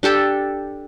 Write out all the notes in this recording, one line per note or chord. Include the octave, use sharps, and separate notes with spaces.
D4 G4 A4 G5